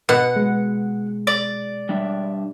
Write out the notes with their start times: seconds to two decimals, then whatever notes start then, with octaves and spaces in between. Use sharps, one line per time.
0.09 B2 F#5
0.36 G#3
1.27 D5
1.89 G3 D4 E5